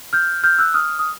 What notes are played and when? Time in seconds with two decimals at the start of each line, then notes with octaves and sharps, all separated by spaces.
0.13 F6 G6
0.44 F6 G6
0.59 E6 F#6
0.74 D#6 F6
0.99 D#6